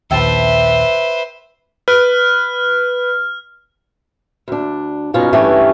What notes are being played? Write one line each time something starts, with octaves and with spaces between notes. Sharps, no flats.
A#1 D#2 B4 C5 E5 G5 A5
B4 F6
D2 D4
G2 B2 C#4 D#4 F4
G2 E3 A3 C#4 G4